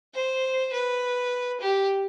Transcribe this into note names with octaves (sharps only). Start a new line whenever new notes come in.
C5
B4
G4